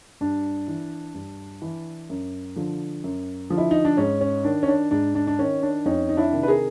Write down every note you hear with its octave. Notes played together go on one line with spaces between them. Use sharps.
G2 D4
E3
G2
E3
F#2
D3 F3
F#2
D3 F3
E4
D#4
D4
G#2 C#4
C#4
D#3 D4
C#4
D4
G#2 D4
D4
D4
D#3 C#4
D4
F2 C#4 D#4
D#4
D4 E4
C3 D#3
B4
G#4 A#4